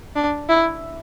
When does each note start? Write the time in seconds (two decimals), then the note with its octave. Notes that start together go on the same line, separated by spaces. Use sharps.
0.16 D4
0.49 E4